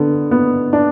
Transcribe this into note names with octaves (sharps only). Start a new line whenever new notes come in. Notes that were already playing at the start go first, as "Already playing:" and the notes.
Already playing: D3 B3
B3
D4